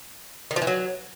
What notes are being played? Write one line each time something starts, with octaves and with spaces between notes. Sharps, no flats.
D#3
F3
E3
F#3